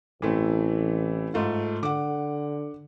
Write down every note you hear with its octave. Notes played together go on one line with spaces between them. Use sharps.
A1 E3 A3 C4
G#2 A3 F4
D3 F#5 D6